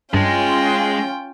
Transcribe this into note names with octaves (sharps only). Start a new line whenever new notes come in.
G2 G#3 C#4 F4 G5 A5